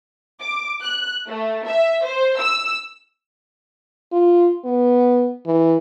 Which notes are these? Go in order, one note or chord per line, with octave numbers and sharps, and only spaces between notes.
D6
F#6
A3
E5
C5
E6
F4
B3
E3